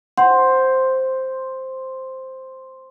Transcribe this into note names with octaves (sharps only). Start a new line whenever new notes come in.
C5 F#5